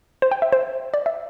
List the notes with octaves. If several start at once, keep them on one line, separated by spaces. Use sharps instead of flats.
C5
G5
E5
C5
D5
E5